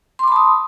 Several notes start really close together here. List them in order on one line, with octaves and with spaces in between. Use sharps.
C6 D6 B5 A5 D#6